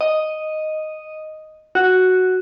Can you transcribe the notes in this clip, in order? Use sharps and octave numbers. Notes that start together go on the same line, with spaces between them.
D#5
F#4